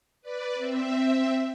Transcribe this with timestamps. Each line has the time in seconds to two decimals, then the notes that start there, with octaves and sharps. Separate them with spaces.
0.22 B4 D5
0.55 C4 E5